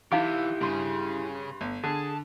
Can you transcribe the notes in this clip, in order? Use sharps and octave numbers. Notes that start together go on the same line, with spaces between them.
E3 D#4 E4 G4 F5 D6
G2 C#3 G#4 C6
G1
D3 G#4 A5